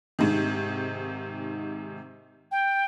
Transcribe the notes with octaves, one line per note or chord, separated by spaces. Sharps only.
G#2 C3 D#3
G5